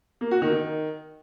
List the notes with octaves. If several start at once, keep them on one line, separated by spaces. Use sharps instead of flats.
A#3
F#4
D#3
D#3